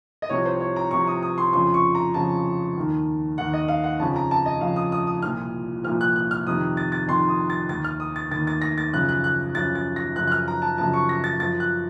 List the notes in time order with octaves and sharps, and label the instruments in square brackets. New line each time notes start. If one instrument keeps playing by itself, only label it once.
[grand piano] D#5
C2 C3 F3 C#5
C5
C#5
A#5
C2 C3 F3 C#6
D#6
D#6
C6
F2 C#3 F3 C6
C#6
A#5
F2 C#3 F3 A5
D#2 D#3
D#2 D#3 F#5
D#5
F5
F#5
F2 C#3 F3 A5
A#5
A5
D#5
F2 C#3 F3 F5
D#6
D#6
D#6
C2 A#2 F3 F6
C2 A#2 F3 F6
F#6
F#6
F6
F2 C3 D#3 D#6
A6
A6
F2 C3 D#3 C6
D#6
A6
D#2 D#3 A6
F6
D#6
A6
D#2 D#3 A6
A6
A#6
A6
F#2 C#3 F3 F#6
F#6
F#6
F#2 C#3 F3 A6
A6
A#6
F#2 C#3 F3 F#6
F#6
F6
A#5
A5
F#2 C#3 F3 A5
C#6
A#6
A6
F#2 F3 A6
F#6